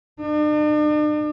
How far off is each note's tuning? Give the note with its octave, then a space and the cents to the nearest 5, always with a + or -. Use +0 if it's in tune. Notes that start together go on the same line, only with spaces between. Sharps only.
D4 +45